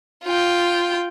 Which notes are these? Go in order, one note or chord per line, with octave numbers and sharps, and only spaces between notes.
F4 G5